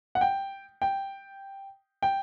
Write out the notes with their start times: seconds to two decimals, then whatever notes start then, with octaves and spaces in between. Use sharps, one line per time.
0.15 F#5
0.21 G5
0.82 G5
2.02 G5